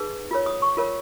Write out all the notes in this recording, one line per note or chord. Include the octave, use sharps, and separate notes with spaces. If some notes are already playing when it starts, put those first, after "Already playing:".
Already playing: D#4 G#4 B4
F4 A#4 C#5
D#6
C#6
F4 A#4 C#5